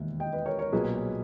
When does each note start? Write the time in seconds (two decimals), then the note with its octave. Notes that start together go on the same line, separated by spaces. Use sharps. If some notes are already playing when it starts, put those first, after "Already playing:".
Already playing: E1 D#2 D#3 E5
0.20 D#5 G5
0.33 B4 D#5
0.46 A#4 C#5
0.59 A#4 C#5
0.72 B1 A#2 A#3 G#4 B4